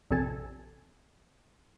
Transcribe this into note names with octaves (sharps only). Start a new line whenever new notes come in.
A#1 F2 C3 A4 G#5 A5